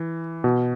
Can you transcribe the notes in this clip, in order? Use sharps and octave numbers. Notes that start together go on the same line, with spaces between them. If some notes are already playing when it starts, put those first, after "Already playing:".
Already playing: E3
B2